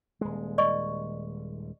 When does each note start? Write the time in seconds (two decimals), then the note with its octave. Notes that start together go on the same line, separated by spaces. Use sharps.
0.21 D#1 G#3
0.58 D5 D#5 C#6